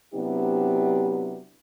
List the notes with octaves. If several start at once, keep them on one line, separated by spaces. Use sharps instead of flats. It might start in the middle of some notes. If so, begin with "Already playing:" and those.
C3 F#3 B3 D4 E4 G4